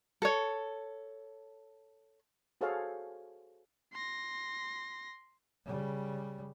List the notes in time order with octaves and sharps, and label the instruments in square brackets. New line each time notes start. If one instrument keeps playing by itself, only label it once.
[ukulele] A4 C#5
[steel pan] F#4 G#4 A4 C5 C#5 F5
[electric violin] C6 A#6
[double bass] C#3 G3